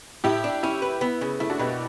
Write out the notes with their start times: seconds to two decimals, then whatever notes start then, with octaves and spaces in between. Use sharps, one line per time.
0.24 A2 E4 G4
0.44 D4
0.63 C#4 E4
0.82 B4
1.01 B3
1.21 C#3
1.40 A3 E4
1.50 D4 F#4
1.59 B2 G4 B4